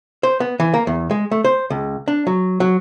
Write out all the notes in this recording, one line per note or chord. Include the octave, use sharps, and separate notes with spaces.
C5
B3
E3
A#3
E2
G#3
A3
C5
C#2
D4
F#3
F#3